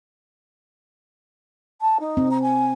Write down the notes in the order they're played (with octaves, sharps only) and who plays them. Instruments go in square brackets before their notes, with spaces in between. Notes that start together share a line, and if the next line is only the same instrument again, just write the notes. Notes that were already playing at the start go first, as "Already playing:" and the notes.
[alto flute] A5
D#4
[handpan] C4
[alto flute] A#5
G#5